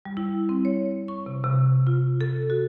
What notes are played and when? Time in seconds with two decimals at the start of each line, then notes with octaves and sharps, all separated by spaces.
0.05 G3
0.17 E4
0.49 C4
0.65 C#5
1.08 C#6
1.26 C3
1.44 C3
1.87 F4
2.21 A4
2.50 F#4